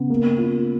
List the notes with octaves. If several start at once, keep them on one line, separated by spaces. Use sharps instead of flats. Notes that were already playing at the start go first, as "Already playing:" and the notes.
Already playing: C#3 B3
A#3
F4